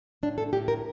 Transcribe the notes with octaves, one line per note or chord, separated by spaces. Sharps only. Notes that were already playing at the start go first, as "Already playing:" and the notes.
A2 D4
A4
A2 G4
A#4